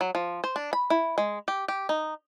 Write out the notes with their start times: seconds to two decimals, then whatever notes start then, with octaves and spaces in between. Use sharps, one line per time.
0.01 F#3
0.15 F3
0.44 C5
0.56 D4
0.73 B5
0.90 E4
1.18 G#3
1.48 G4
1.68 G4
1.89 D#4